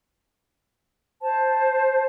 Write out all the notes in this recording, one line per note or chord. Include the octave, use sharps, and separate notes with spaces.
C5 A5